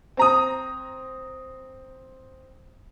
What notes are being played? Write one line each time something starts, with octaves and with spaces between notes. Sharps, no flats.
C4 A#5 D#6